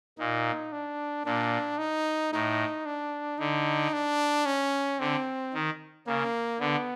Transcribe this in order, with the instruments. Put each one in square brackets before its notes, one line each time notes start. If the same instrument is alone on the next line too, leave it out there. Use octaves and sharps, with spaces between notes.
[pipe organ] A#2 [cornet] D#4
[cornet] D4
[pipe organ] A#2 [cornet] D4
[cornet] D#4
[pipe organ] A2 [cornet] D#4
[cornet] D4
[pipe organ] D3 [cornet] D#4
[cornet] D4
C#4
[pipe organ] D3 [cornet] C4
[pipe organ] D#3
[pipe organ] C#3 [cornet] A#3
[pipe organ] D3 [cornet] B3